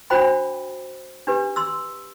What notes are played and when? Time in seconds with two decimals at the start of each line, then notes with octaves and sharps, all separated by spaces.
0.10 D4 F#4 C5 G5 B5
1.27 D4 G4 B4
1.56 C6 E6